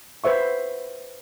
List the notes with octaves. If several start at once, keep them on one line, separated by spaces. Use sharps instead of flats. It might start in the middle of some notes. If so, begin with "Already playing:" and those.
B4 C5 E5 C#6